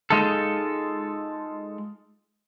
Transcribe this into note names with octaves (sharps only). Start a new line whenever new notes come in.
G#3 D#4 F4 A4